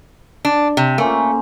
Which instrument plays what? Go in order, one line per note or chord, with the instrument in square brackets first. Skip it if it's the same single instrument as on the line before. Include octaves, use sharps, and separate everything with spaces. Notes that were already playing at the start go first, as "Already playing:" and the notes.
[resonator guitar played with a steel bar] D4
C3
[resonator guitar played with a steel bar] A3 [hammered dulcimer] A#3 C#4 C5